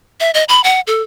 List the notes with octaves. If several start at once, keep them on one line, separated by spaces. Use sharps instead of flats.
E5
D#5
B5
F#5
A4